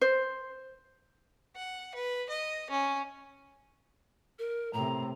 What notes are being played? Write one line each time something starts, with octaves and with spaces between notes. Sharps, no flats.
C5
F#5
B4
D#5
C#4
A#4
A2 C3 A#5